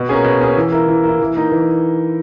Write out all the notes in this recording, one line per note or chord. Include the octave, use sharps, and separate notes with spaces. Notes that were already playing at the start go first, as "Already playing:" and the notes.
Already playing: B2
A#3 C#4 G#4
B2
A#3 C#4 G#4
E3
A#3 E4
E3
A#3 E4
E3
A#3 D#4
E3